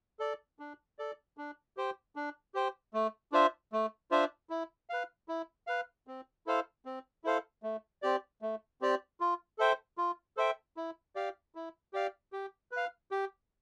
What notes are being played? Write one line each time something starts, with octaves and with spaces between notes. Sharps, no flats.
A4 D5
D4
A4 D5
D4
G4 C5 G5
D4
G4 C5 G5
A3
D4 F4 C5 E5
A3
D4 F4 C5 E5
E4
B4 F5
E4
B4 F5
C4
E4 A4 C5 F5
C4
E4 A4 C5 F5
A3
C4 G4 D5
A3
C4 G4 D5
F4
A4 C5 E5 G5
F4
A4 C5 E5 G5
E4
G4 D5 F5
E4
G4 D5 F5
G4
B4
F5
G4